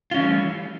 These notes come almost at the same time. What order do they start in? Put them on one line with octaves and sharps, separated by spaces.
F4 C#4 E3 A3 G3